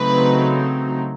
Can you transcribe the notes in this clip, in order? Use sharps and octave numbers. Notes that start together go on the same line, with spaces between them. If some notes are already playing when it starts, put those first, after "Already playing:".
Already playing: C#3 F#3 A3 C4 D#4 B4